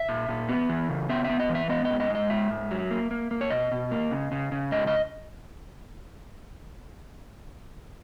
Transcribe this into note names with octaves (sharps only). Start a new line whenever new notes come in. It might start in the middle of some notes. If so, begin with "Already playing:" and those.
Already playing: E5
A#2
A#2
B3
E3
C#3
B3 E5
B3 E5
D#5
E3
E5
B3 D#5
G#2 D#5
D#5
G#3
D#5
G#2 E5
G#2
F#3
A#3
A#3
A#3
C#5
B2 D#5
B2
A#3
C#3
C#3
C#3
G#2 D#5
D#5